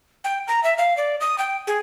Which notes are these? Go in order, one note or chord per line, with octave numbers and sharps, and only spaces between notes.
G5
A#5
E5
F5
D5
D#6
G5
G#4